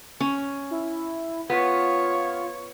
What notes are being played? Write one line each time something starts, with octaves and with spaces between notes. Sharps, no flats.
C#4
E4
B3 F4 C#5